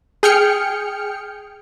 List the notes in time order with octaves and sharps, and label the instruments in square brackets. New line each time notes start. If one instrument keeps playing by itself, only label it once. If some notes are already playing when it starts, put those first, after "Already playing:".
[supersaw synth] G#4 G5 F6 C#7